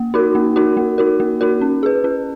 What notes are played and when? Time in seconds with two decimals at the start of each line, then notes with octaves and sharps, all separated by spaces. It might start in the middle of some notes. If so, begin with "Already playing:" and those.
Already playing: A#3
0.14 D#4 F#4 A#4
0.35 A#3
0.56 D#4 F#4 A#4
0.77 A#3
0.98 D#4 F#4 A#4
1.20 A#3
1.41 D#4 F#4 A#4
1.61 C#4
1.83 G#4 B4
2.04 C#4